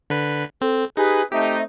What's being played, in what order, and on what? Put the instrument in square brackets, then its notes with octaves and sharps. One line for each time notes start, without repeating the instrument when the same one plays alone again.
[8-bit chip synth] D3 B4
[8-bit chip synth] C4 [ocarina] A4
[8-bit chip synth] D#4 [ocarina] G4 [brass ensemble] G#4 B4
[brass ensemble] A3 C4 D#4 [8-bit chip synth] G4 [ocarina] E5